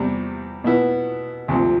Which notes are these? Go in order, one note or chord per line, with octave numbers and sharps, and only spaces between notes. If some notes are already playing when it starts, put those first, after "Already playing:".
Already playing: E2 C3 G3
B2 B3 E4
D2 C3 F3